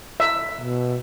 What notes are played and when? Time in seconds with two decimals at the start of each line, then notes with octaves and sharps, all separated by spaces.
0.20 E5
0.61 B2